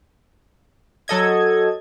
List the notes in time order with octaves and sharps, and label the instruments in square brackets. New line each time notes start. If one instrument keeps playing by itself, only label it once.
[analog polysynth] F#3 A4 D#5 G#6